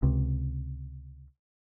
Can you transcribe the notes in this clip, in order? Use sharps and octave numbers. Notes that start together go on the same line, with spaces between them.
C#2 C3